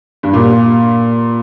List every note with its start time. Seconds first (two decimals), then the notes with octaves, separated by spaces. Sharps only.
0.23 G2
0.33 A#2